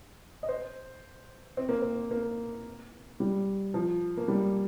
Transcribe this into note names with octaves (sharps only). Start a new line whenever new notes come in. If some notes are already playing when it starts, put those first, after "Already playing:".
D#5
C5
C4
A#3
C4
A#3
G3
F3
A#3
G3